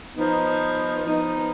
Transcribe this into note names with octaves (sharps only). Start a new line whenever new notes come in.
F3 B3 D#4
F3 B3 D#4